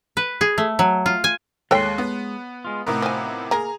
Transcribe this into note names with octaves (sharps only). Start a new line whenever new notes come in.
B4
G#4
A3
F#3
F4
G#5
D#2 G#3 A4 C#5 G5 B5 C6 F#6
B3
G#3 F4
A2 C3 B3 D#4 A#4
F3 G#5
A#3 G#4 A#4 A#5